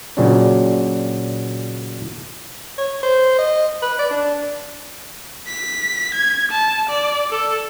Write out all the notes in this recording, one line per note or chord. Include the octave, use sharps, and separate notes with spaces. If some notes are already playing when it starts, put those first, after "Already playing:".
A#2 C#3 F#3 C4 D4
C#5
C5
D#5
B4
D5
D4
B6
G#6
A5
D5
A4